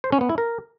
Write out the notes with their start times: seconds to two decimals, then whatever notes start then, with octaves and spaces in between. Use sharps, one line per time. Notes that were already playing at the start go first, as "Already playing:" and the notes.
0.04 C5
0.12 C#4
0.21 B3
0.29 E4
0.38 A#4